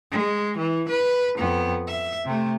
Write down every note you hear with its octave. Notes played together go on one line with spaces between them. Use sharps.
G#3
E3
B4
F2 B3
E5
C3 A3